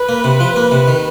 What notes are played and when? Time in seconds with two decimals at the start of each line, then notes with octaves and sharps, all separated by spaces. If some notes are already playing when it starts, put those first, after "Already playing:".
Already playing: B4
0.09 A#3
0.24 C3
0.40 F3
0.56 A#3
0.71 C3
0.88 D#3